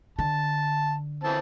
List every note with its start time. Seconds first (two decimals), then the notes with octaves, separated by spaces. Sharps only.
0.19 D3 A5
1.24 E3 C4 A5